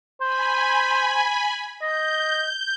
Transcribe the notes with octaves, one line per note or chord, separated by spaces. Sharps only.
C5 G#5 B5
D#5 G6